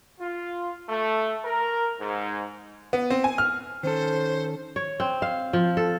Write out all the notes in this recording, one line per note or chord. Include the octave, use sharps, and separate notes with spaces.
F4
A3
A#4
G#2
B3
C4
G#5
F6
D#3 C#4 A4 C5
C#5
C4
F5
F3
A4